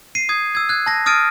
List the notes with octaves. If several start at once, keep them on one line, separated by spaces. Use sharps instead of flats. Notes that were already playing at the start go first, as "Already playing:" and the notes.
C7 D#7
D#6 G#6
E6 G#6
F#6 G#6
A5 A#6
D#6 F6 A6 D7 D#7